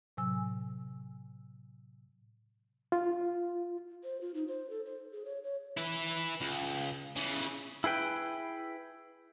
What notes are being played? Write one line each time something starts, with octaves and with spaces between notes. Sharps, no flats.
A2 C3 F#3 G#5 E6
F4
C5
F4
D#4
C5
A4
C5
G#4
C#5
C#5
E4 B4
C#2
C#3 E3
E4 G#4 B4 G5